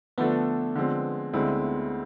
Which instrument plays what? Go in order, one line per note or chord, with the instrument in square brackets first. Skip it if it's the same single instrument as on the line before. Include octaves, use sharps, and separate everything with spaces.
[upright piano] D3 F3 A3 D4 A4 [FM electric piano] B3
[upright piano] D3 F3 G#3 C4
D2 D3 G#3 C4 E4